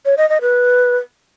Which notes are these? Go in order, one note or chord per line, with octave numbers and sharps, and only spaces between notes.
C#5
D#5
D#5
B4